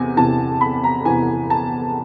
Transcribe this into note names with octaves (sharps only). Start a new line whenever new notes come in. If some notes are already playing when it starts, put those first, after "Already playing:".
Already playing: E2 C3 G#5
E2 C3 E3 A5
B5
A#5
E2 C3 E3 G#5
A5